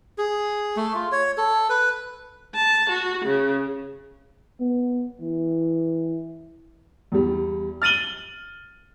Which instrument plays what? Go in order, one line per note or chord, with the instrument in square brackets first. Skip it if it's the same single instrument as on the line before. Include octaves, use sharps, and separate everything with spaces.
[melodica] G#4
A3
F4
C#5
A4
B4
[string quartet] A5
F#4
C#3
[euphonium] B3
E3
[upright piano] E2 G3
F6 A6 D#7 F#7 G7